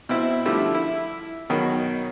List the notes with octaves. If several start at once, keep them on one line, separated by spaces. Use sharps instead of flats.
B2 C4 E4
D3 F3 G3 A3 E4
E4
B2 D#3 F#3